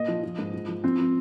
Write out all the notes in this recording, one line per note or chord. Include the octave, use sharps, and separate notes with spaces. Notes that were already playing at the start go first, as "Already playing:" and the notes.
Already playing: A#2 D#5
F3
F3
G#2
F3
F3
F3 C4
F3